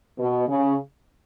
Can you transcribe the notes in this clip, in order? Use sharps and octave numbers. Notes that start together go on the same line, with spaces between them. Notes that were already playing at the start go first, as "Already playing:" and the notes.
B2
C#3